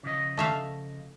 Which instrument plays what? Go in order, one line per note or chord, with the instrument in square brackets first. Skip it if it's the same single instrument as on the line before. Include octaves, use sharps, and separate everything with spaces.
[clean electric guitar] C#3 F3 D#5
[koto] A3 E5 F5